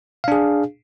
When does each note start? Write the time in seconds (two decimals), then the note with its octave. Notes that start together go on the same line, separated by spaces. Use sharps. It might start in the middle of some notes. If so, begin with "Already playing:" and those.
0.24 F5
0.28 D4
0.32 G#4